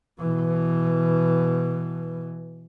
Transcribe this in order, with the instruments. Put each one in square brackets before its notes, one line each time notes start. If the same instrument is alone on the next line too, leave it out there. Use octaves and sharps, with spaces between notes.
[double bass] B2 E3